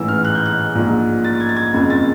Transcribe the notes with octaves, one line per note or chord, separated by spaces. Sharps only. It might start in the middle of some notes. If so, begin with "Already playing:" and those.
Already playing: A1 G#2 E3 E6
F6
F#6
G6
F#6
A#1 G#2 F3
A6
G#6
A6
G#6
F#1 F2 C#3
A6